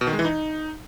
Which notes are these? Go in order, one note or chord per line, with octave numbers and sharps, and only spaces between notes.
B2
D#3
G#3
E3
D#4